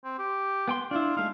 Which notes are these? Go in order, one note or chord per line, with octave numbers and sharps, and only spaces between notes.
C4
G4
B3 G5 C6
D4 E4 F4
G#3 A3 D#4 F5